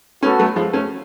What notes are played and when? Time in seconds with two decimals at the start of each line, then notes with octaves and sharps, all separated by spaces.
0.23 A3 B3 C#4 F#4 A4
0.39 F#3 A3
0.56 F3 G#3
0.73 A3 C#4